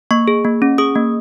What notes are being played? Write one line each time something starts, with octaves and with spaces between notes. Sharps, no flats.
A#3 C#6
G#4
A#3
C#4
G#4 D#6
A#3